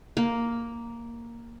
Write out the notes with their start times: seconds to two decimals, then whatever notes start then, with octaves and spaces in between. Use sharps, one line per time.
0.17 A#3